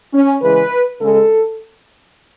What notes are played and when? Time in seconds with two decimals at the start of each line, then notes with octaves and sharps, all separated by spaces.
0.14 C#4
0.43 C#3 E3 G#3 B4
1.01 C#3 G#3 A4